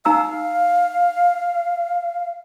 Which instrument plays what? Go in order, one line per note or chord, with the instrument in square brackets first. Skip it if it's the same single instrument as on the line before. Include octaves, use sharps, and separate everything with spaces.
[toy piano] D#4 A#5 E6 [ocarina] F5